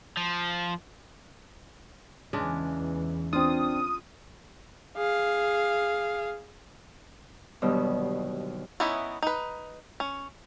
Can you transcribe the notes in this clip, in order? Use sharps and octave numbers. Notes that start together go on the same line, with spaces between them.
F3
E2 C#3 E3 G#3 D4
C4 D4 F4 D#6
G#4 F5
D#2 B2 D3 F#3 G3 B3
E3 B3 C#4 D#4 E4
D#4 B4
C#4